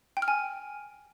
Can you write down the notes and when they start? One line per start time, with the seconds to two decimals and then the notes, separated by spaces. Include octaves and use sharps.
0.17 G5
0.22 F6
0.28 G#5